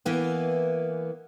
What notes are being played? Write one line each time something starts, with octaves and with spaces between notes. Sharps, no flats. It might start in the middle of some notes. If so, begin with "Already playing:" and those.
E3 A#3 B3